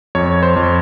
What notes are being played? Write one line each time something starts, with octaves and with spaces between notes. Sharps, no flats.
F2 C#5
C5
F2